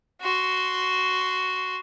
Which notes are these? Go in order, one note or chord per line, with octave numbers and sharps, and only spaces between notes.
F#4 C6